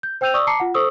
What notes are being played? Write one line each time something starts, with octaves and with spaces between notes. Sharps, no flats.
G6
C5 G5 E6 G6 D#7 F7
D5 C#6 D#6 E6
A5 A#5 D6 C7 C#7
F4 F#5
A4 C5 C#6 D#6 E6